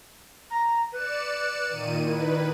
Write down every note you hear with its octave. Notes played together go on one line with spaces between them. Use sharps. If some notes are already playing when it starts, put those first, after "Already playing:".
A#5
B4 D5 C#7 E7
A#2 D#3 D#7
D#3 E4 B4